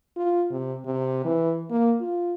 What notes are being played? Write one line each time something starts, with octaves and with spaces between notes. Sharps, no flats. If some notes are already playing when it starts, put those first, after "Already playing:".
F4
C3
C3
E3
A#3
F4